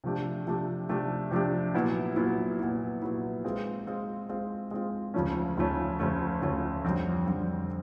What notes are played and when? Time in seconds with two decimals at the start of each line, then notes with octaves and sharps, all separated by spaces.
0.04 C3 F3 A3 D4 G4
0.47 C3 F3 A3 D4 G4
0.89 C3 F3 A3 D4 G4
1.31 C3 F3 A3 D4 G4
1.74 A#2 F#3 B3 E4
2.16 A#2 F#3 B3 E4
2.59 A#2 F#3 B3 E4
3.02 A#2 F#3 B3 E4
3.44 G#3 C4 F4
3.87 G#3 C4 F4
4.29 G#3 C4 F4
4.71 G#3 C4 F4
5.14 D2 C#3 F3 A3 C#4
5.57 D2 C#3 F3 A3 C#4
5.99 D2 C#3 F3 A3 C#4
6.42 D2 C#3 F3 A3 C#4
6.85 F2 D3 G3 C4
7.27 F2 D3 G3 C4